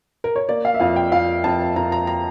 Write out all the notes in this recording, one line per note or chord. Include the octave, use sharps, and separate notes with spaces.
A#4
C#5
A#3 D5
F5
E5
F2 F5
G5
F2 F5
F2 A5
F2 A#5
A#5
A#5